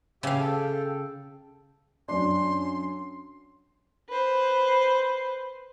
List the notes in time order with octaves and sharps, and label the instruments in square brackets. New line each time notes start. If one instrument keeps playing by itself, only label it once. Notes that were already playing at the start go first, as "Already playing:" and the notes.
[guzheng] C#3 F5 [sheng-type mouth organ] G4 E5
[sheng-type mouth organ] A4 G5
[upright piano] F#2 D4 [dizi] C6
[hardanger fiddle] B4 C5